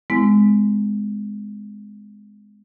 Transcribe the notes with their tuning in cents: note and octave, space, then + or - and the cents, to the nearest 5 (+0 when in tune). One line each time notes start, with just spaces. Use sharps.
G#3 +0 C4 -45 E4 +0